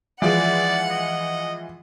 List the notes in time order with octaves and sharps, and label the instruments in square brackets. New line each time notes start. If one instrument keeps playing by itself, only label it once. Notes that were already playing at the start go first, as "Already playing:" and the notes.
[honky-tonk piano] E3 F3 G#3 [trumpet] D5 [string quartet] F#5
[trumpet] D#5